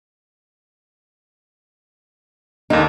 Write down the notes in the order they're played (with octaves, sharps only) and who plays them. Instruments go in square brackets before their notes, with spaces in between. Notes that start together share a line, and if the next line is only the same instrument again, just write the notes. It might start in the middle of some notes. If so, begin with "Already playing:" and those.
[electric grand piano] D#2 D3 A#3 [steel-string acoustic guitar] D#4